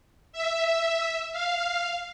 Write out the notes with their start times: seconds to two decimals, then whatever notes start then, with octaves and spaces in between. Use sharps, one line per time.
0.33 E5
1.32 F5